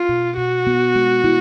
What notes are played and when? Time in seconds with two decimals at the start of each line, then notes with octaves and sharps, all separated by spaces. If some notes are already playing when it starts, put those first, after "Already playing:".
Already playing: F4
0.09 B2
0.37 B2 F#4
0.67 B3
0.95 G#3
1.24 E4